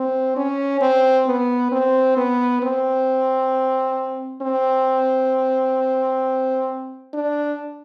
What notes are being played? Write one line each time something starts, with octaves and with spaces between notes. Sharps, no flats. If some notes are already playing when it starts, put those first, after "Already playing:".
Already playing: C4
C#4
C4
B3
C4
B3
C4
C4
D4